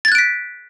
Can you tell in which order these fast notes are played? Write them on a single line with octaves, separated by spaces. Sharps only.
A6 G#6 F#6 D7 B6